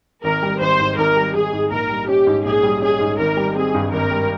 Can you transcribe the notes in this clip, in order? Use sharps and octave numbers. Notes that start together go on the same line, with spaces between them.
G#1 A#4
G3
G#1 C5
G#2
G#1 A#4
G3
G#1 G#4
G#2
A#1 A#4
G3
C#4 G4
G#2
A#1 G#4
G3
C#4 G#4
G#2
G#1 A#4
G3
C4 G#4
G2
G#1 A#4
G3